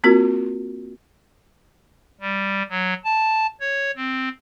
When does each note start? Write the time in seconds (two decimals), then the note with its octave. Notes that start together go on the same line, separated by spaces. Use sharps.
0.04 A#3 C4 F4 F#4 A#4
2.21 G3
2.70 F#3
3.04 A5
3.60 C#5
3.96 C4